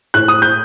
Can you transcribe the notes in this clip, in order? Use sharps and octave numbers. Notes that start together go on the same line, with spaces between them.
A2 F#6
D#6
G6